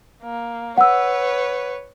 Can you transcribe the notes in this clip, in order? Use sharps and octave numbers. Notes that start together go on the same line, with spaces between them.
A#3
B4 C#5 F#5 E6